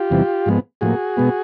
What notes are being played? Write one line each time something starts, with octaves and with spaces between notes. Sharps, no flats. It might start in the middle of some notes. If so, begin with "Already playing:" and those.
Already playing: F4 G4
E2 C3 E3 G3
G#2 F3 G#3 B3
A2 F3 A#3 F#4 G#4
B2 G#3 B3